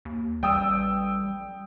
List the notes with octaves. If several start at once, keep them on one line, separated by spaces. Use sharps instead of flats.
D#2
A1 G3 G5 D#6 E6